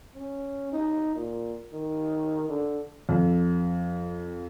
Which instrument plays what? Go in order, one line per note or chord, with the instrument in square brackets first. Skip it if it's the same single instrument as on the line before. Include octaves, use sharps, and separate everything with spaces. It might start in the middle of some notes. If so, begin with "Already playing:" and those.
[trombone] C#4
D#4
A#2
D#3
D3
[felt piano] F2